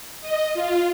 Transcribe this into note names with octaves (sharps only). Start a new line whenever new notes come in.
D#5
F4